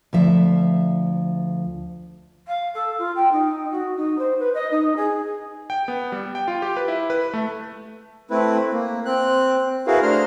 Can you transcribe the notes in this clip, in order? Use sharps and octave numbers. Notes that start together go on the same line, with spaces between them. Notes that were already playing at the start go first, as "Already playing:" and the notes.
D2 F3 E5
F5
A4
F4
G5
D#4
F#4
D#4
C5
B4
D#5
D#4
G#4
G5
B3
G3
G5
F4
G4
B4
E4
B4
A3
A3 C4 E4 B4
A#3
C4 F#6
E4 F#4 G#4 A#4 B4 F5
A3 D4 C5 A#5 C6 F6